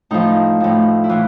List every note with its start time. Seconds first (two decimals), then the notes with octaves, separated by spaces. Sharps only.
0.11 A2 F3 D#4
0.60 A2 F3
1.04 E4
1.09 A2 E3 F4